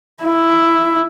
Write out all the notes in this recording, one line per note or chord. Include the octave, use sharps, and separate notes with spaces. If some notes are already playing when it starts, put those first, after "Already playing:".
E4